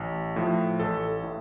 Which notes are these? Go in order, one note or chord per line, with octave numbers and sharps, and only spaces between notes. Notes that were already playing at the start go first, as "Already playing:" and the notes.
Already playing: A1
A2 F3
A1 A4
A2